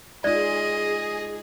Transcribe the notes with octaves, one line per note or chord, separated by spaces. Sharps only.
G#3 D#4 F4 G#4 D5 D#5